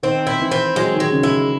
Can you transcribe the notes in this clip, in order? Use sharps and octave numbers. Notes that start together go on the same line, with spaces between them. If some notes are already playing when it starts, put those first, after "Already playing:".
D#3 C4
E4
E3
C4
F#3 G#3
D#3
G#3
C#3
E4